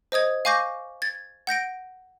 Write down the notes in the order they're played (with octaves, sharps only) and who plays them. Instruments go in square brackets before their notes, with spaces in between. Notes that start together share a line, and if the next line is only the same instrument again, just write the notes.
[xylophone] C5 D#5 D#6 G#6
F5 G#5 C#6 D6 G6 A#6
G#6 A6
F#5 G6 A#6 D7